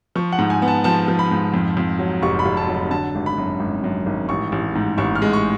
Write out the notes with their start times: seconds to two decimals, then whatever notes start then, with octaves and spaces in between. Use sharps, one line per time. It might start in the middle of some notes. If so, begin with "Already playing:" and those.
0.16 F3 C#6
0.32 F#5
0.39 G#2
0.50 G#5
0.62 B3
0.68 A5
0.84 F3 A5
1.08 F3
1.19 B5
1.31 G#2
1.54 F2
1.77 F2
1.99 F#3
2.23 F1 C#6
2.39 B5
2.46 F1
2.57 A5
2.68 F#3
2.74 B5
2.91 D3 A5
3.15 G#1
3.26 B5
3.38 F#2
3.60 G#1
3.84 F#2
4.06 G#1
4.29 A1 C#6
4.52 A1
4.75 G#2
4.98 A1 C#6
5.15 F6
5.22 G#3
5.33 C#6